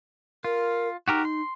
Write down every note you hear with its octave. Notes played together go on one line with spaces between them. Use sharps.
F4 A#4
D#4 F#4 G4 A#4
C6